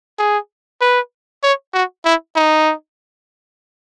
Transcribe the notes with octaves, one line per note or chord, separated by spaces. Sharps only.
G#4
B4
C#5
F#4
E4
D#4